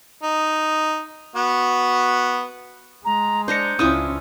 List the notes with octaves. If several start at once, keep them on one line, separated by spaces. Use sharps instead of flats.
D#4
B3 F#4
G#3 A#5
D4 C5 D#5 A#5 G6 C#7
C#2 C#4 D4 E4 F4 D#6